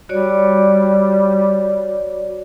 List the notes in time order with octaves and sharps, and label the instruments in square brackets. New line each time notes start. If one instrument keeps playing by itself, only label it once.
[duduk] G3 [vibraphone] F#4 C#5 D5